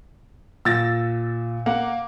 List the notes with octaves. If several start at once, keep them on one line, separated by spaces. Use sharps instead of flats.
A#2 E6 A6 A#6
A#3 F#5